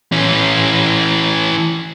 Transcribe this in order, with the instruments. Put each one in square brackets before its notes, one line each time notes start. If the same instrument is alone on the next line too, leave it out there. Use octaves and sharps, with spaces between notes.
[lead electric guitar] E3 C#4